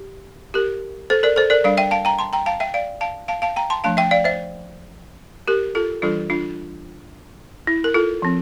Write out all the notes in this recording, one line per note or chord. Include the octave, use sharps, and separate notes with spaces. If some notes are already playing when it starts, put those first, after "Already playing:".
Already playing: G4
G4 A#4
A4 C5
A#4 D5
A4 C5
A#4 D5
G3 D4 D5 F5
E5 G5
F5 A5
G5 A#5
A5 C6
G5 A#5
F5 A5
E5 G5
D5 F5
F5 A5
F5 A5
F5 A5
G5 A#5
A5 C6
F3 A3 D4 F5 A5
E5 G5
D5 F5
C5 E5
G4 A#4
F4 A4
E3 G3 D4 F4 A4
D4 F4
E4
A#4
F4 A4
F3 C4